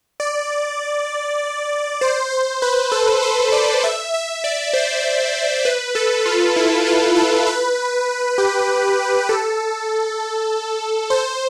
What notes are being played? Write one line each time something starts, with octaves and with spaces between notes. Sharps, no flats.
D5
C5
C5
B4
A4
C5
D5
E5
E5
D5
C5
B4
A4
F4
E4
F4
A4
B4
G4
A4
C5